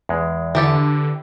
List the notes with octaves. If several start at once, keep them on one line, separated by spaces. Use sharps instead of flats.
E2 G#3
D3 E3 G4 A4